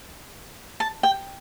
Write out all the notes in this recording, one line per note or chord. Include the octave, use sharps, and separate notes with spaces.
A5
G5